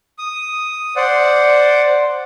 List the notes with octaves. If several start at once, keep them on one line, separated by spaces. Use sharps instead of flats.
D#6
C5 D5 F#5